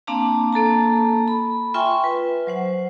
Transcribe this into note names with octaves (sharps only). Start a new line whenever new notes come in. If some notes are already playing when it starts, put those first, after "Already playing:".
A#3 C4 D4 F5 A5 A#5
A#3 A4 A5 A#5
B5
F4 E5 G5 G#5 C6 C#6
B4
F#3 C5 F#5